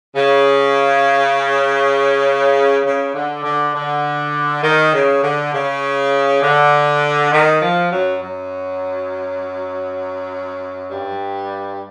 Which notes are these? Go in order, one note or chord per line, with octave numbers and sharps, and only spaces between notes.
C#3
C#3
D3
D3
D3
D#3
C#3
D3
C#3
D3
D#3
F3
F#2 F#3
F#2 F#3
G2 G3